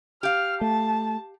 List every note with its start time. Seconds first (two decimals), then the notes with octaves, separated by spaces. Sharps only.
0.23 G4 F5 F6
0.61 A3 A5